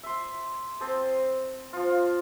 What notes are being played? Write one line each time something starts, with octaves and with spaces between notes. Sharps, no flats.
E5 C6
C4 C5 A5 D#6
F3 F4